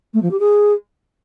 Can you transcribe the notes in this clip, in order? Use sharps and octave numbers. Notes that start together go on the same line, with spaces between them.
A3
F3
G4
G#4